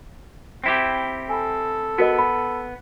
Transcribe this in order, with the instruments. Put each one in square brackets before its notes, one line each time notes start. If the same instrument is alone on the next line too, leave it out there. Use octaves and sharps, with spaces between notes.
[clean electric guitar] C4 E4 G4
[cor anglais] A4 [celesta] G#5 B5
[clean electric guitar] B3 [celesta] F#4 A#4 D#5
[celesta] B5